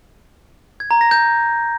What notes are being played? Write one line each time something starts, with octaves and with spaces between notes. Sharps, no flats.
G#6
A#5
A#6
G6